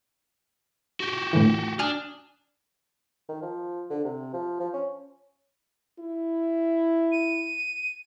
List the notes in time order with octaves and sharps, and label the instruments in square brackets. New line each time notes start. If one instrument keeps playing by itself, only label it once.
[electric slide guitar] F#4 G4
[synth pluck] A2 D3 E3
[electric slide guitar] D4 [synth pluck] G#5 D#6 F6
[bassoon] D#3
F3
D3
C3
F3
F3
C#4
[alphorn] E4
[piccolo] D#7